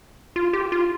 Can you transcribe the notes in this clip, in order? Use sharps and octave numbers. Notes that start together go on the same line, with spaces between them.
F4
G4
F4